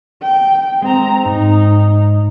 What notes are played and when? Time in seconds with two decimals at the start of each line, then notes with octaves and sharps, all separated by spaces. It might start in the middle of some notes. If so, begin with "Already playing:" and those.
0.22 G5
0.82 G#3 C4 A#5
1.25 G#2 D#4